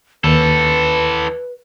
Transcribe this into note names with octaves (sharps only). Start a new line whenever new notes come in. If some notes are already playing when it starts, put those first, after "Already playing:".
D#2 E3 A4 B4